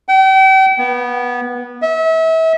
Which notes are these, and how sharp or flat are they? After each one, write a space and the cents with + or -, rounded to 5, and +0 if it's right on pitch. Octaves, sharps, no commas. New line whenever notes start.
G5 -40
B3 -20
E5 -35